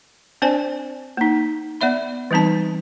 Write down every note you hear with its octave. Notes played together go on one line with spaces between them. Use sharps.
C4 D4 C5 D5 G#5
A#3 D#4
B3 D5 E5 B5
E3 G3 C4 D#4 A5